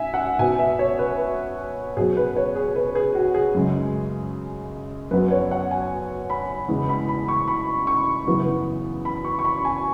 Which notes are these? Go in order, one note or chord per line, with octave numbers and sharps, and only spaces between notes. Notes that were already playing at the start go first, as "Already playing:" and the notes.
Already playing: G#2 E5 G#5
F#5
B2 B3 G#5
E5
C#5
B4
B2 F#3 B3 G#4
B4
C#5
G#4
B4
G#4
F#4
G#4
F#2 C#3 G#3
F#2 F#3 B3 B4
C#5
F#5
G#5
B5
E2 C#3 G#3 B3
B5
B5
C#6
B5
C#6
F#2 C#3 E3 B3
B5
C#6
C#6
B5
G#5